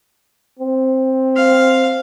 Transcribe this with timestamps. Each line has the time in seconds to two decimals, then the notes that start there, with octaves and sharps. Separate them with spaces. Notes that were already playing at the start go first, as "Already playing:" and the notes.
0.60 C4
1.36 F5